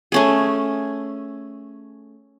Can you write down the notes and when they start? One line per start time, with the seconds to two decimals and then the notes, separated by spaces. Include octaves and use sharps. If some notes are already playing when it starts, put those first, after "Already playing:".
0.12 A3 C#4 G#4